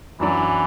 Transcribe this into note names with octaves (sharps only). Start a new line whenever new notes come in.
F#2 E3 F#3 D4